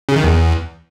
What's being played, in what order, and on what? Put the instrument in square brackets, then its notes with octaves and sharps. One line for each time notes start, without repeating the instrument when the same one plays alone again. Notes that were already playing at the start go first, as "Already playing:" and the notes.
[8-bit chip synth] C#3
D#3
E2